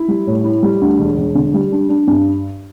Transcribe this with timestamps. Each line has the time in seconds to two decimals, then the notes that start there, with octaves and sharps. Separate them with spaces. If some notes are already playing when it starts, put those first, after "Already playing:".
Already playing: E4
0.08 G3
0.27 A2
0.44 E4
0.63 G3
0.81 D2
0.99 E1
1.18 E1
1.35 D3
1.54 G3
1.72 D4
1.89 D4
2.07 G2